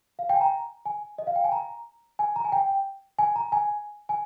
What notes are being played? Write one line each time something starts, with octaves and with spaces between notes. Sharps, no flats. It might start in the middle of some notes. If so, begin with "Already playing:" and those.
F5
G5
G#5
A#5
G#5
D#5
F5
G5
G#5
A#5
G#5
A#5
G#5
G5
G#5
A#5
G#5
G#5